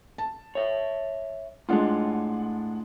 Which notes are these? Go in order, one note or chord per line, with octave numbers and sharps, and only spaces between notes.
A5
C#5 E5
A2 G#3 D4 F4 F#5